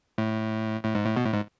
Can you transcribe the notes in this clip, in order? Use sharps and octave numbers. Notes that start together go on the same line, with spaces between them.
A2
A2
G#2
A2
B2
A2
G#2